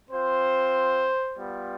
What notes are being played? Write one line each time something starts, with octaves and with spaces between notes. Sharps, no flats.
C4 F4 C5
G3 B3 F4